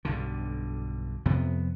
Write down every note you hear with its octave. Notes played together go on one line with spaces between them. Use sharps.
B1 G2 D3
F2 C3 B3